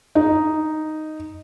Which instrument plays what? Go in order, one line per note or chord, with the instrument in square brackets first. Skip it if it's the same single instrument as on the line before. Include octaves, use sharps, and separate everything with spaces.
[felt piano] D#4